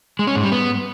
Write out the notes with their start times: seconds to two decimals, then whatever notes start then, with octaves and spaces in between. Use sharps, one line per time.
0.19 G#3
0.27 C#4
0.35 G#2
0.44 G3
0.52 B3